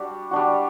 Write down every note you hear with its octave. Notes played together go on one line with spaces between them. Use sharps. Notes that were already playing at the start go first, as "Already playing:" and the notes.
Already playing: G3 D4 F#4
G3 D4 F#4